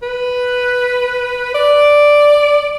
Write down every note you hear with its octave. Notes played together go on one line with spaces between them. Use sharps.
B4
D5